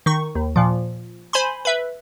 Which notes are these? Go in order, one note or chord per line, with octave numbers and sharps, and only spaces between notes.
D#3 C#6
D#2
A#2 F3
C5 G#5 B5 C6
B4 E5